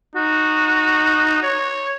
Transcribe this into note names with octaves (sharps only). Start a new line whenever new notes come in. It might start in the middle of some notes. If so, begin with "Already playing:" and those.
D#4 F#4
C#5